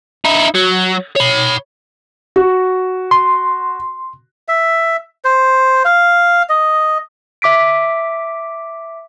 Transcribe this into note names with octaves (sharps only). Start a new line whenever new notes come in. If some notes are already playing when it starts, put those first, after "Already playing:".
D#4 E4
F#3
C#5 B5
F#4
C6
E5
C5
F5
D#5
E5 D6 B6 D7